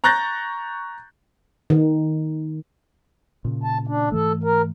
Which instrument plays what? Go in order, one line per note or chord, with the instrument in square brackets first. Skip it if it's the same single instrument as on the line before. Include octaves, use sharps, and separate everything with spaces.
[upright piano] A#5 C#6 F#6 G6 A6 A#6
[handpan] D#3
[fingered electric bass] A#2 C#3
[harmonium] A5
D4
[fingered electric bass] G#2 E3 A3 [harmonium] A4
[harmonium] A#4